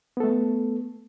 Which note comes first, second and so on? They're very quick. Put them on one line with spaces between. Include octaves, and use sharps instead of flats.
B3 A4 A3